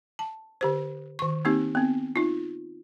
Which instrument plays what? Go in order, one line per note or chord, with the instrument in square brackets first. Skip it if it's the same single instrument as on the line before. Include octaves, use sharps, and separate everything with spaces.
[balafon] A5
D3 G4 C5
D#3 C#6
A#3 C4 D#4 G4
B3 C4
D#4 F4